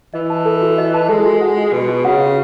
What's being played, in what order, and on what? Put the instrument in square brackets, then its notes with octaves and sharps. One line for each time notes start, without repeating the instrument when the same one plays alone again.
[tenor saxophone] E3 [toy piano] D#5
[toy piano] A5
A4
F#4
D#5
A5
[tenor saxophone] G#3 [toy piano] A4
[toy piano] F#4
F#5
F#4
[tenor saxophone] B2 [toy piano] B4
[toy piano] F#4
[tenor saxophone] C#3 [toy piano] F#5
[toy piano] F#4